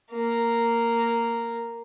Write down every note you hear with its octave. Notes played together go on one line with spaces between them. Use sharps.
A#3